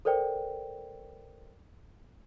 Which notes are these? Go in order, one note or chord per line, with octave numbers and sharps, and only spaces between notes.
A4 A#4 C5 D5 G5